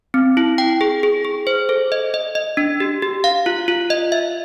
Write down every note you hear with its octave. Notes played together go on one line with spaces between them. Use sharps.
C4
E4
G5
G#4
G#4
G#4
C5
A4
D#5
D#5
D#5
D4
G4
G4
F5
F4
F4
D#5
E5